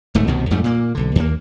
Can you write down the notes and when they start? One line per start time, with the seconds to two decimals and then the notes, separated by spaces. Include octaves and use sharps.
0.15 D1 G#2 A3
0.27 C2 B2 D#3
0.50 F2 G#2 G3 A3
0.64 A#2 A#3
0.95 B1 D3
1.16 D#2 A#3